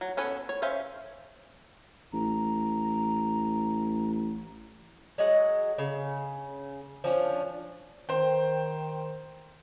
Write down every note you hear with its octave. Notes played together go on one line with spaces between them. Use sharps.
F#3
B3 C#4 A4 B4 C#5
C#5
C#4 C5 C#5 E5 F5
A1 A#5
F#3 G#3 F#5
C#3
F3 C#4 D4
D#3 C5 G5